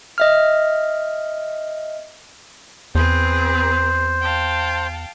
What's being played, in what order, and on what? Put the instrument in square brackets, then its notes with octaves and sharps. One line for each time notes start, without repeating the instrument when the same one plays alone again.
[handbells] D#5 E5 F6
[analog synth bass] E2 [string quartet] C4 G#4 B4 [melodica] C5
[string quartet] F5 G5 A5